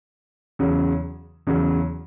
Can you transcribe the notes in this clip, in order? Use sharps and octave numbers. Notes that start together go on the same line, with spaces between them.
E2 C#3 F#3
E2 C#3 F#3